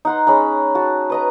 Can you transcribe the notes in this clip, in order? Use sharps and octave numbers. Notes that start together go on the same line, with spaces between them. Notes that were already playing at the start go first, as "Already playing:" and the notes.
D#4 F#5 C6
G#3 C#4 D#4 B5
F#4 A5
B4 D#5 A#5